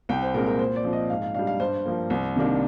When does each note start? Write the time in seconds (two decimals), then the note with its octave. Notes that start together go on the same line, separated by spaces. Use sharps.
0.09 C2 G5
0.22 C5
0.34 A#2 G#3 C4 A#4
0.46 A#4
0.59 A#2 C5
0.76 D5
0.84 F3 C4
0.93 D#5
1.10 G#2 F5
1.22 F5
1.34 G3 D4 F5
1.47 F5
1.60 G2 C5
1.86 F3 A#3
2.10 C2
2.36 C3 D#3 A#3 D4